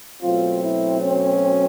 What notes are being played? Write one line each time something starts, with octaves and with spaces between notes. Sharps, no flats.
B2 F#3 A3 C4 F4
E4
C#4